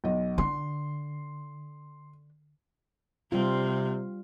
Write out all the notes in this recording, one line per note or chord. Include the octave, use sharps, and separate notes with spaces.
B1 D#5
D3 C6
C3 G3 C4 F4